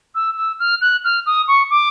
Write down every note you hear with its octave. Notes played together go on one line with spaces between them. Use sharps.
E6
E6
F6
F#6
F6
D#6
C#6
D6